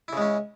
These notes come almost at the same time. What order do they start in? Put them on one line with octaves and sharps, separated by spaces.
E4 C#3 G#3 C#4